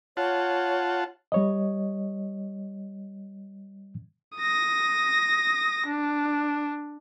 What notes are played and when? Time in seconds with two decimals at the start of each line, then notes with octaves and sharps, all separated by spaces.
0.17 F4 C#5 F#5 A5
1.32 G3 C#5 D#5
4.38 D#6 A#6
5.86 D4